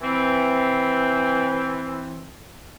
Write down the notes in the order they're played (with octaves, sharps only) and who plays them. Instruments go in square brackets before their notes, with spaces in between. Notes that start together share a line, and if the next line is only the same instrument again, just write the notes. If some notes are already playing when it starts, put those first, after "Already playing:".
[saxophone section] E3 C4